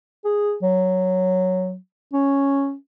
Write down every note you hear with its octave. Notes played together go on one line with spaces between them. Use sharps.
G#4
F#3
C#4